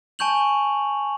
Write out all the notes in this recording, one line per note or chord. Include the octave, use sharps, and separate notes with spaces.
G#5 A5 C#6 G6 F7 F#7